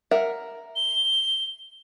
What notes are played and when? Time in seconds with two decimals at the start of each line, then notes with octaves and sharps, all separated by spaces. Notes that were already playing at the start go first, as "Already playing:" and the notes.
0.11 A#4 E5 F#5
0.76 G7